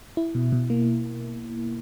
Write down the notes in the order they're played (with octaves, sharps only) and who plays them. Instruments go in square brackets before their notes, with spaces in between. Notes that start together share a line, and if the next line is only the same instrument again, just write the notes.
[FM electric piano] E4
B2
B2
A#3